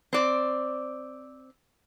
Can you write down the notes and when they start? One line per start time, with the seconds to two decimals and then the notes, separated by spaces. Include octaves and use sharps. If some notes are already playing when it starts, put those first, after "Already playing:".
0.13 C4 D5